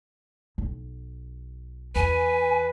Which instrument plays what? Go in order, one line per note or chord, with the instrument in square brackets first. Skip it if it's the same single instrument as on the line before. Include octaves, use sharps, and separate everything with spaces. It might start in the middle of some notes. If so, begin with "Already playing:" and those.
[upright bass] B1
[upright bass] E2 [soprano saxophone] B4 [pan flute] G#5